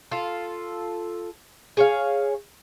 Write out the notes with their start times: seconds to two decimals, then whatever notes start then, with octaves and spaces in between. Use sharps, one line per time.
0.12 F4 A4
1.77 G#4 C#5 F5